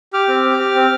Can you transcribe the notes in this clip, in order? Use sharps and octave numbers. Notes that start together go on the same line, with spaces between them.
G4 D6 F6
C4
G4
G4
C4